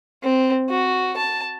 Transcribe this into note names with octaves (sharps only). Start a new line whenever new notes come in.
C4
F#4
A5